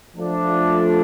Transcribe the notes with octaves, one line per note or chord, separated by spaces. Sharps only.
F3 A3 D4 F4